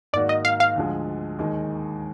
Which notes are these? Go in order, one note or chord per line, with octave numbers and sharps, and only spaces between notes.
G#2 D#3 A#3 D#4 F#4 D5
D#5
F5
F5
D2 D3 F3 G#3
D#2 D#3 G#3 D#4